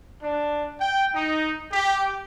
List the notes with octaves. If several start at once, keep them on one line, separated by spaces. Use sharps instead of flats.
D4
G5
D#4
G4